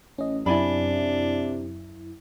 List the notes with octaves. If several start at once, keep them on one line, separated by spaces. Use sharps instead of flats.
A1 C#4 D#5
F#2 C3 D4 E4 D5 G#5 B5